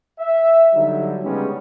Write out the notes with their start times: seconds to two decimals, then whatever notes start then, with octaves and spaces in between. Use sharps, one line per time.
0.19 E5
0.73 D3 F#3 G3 D#4
1.23 C#3 G3 G#3 B3 C#4